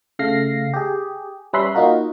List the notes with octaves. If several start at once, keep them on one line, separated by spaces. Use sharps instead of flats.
C#3 A3 F5 A#6 C7
G4 G#4
G3 C#4 B4 E5 B5 C6
A#3 D#4 F4 F#4 A#4